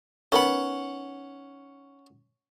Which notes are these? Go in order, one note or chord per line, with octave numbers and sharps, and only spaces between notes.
D#3 B3 C#4 F#5 B5